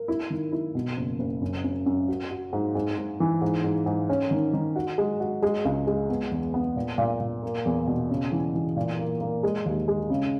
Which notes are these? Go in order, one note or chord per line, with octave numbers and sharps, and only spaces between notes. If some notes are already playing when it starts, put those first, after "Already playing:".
Already playing: A#4
E4
D#3
E4
B2
F#1
F#1
F#2
F#2
F#2
F#4
F#4
G#2
G#2
G#2
E3
G#2
G#2
G#2
C#4
D#3
D#3
F#4
G#3
F#4
G#3
C#2
G#3
B3
E2
B3
A#2
A#2
A#2
A#3
E2
B2
C#3
E3
E3
A#2
A#3
A#3
G#3
D#2
G#3
C#3